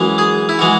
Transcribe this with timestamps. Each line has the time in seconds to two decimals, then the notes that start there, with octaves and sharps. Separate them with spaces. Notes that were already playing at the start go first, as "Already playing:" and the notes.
Already playing: F#2 E3 G#3
0.18 G#4
0.49 E4
0.59 E3 G#3 F#4